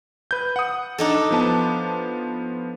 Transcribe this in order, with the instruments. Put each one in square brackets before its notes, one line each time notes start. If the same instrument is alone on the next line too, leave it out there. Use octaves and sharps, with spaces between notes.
[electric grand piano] B4 G6
F#5 D#6
[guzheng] D4 D#4 A4
[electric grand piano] F3 B3 A5